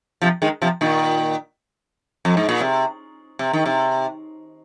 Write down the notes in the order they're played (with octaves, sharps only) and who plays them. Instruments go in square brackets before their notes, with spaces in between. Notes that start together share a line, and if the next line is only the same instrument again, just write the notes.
[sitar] C3 F3
D#3 G#3
C3 F3
A#2 D#3
F2
G#2
A#2
C3
C3
D#3
C3